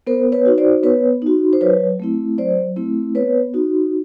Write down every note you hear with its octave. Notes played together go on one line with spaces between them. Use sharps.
B3 A#4 C5
B4 C#5
D#4 F#4
C5 D5
B3 B4 C#5
D#4 F#4
C5
F#3 B4 C#5
A3 C4 E4
F#3 C5 D5
A3 C4 E4
B3 B4 C#5
D#4 F#4